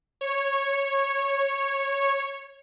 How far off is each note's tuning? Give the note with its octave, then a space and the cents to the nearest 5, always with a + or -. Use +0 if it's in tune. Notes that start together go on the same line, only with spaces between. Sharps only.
C#5 -10